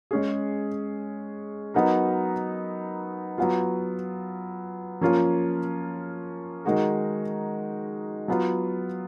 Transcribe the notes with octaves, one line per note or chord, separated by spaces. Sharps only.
G#3 C#4 G#4
F#3 B3 D#4 F#4 A#4
F#3 B3 F4
F3 A#3 C#4 F4
D#3 G#3 D#4 F#4 A#4
F#3 B3 F4